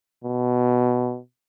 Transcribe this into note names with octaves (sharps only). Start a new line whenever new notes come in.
B2